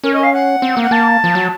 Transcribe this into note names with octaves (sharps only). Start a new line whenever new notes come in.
C#4 A#4
D#5
F5
F#5
C4
A#3
F#5
A#3 A5
F3
F#3